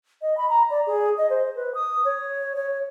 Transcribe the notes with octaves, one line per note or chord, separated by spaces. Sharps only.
D#5
B5
A#5
D5
G#4
D#5
C5
B4
D#6
C#5
C#5